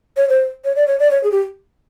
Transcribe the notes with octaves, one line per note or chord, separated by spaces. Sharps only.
C#5
C5
C#5
D5
C#5
D5
C#5
G#4
G4